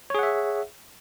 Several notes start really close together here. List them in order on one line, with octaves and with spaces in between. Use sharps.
C#5 G#4 F#5 E5